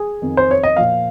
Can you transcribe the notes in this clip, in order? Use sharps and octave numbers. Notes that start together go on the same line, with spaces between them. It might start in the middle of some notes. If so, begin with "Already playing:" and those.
Already playing: G#4
F2 D#3
C5
C#5
D#5
A#2 F3 F5